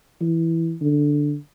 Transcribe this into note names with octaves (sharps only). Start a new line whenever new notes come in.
E3
D3